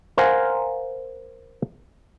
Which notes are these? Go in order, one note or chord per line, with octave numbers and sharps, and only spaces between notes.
A#4 C5 F5 F#5 G#5 A#5